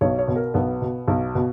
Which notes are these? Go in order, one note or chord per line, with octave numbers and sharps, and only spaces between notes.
B1 C#5
C#5
B2
A#4
B1 B3
B2
B1
B2